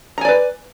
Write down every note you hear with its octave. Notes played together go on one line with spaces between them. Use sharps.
B4 D5 G#5 A#5